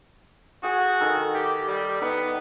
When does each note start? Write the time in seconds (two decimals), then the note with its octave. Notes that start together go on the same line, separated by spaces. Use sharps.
0.63 F#4 G#4 G5 G#5
1.00 D#3 A4
1.34 G4
1.68 G3
2.01 B3 D#4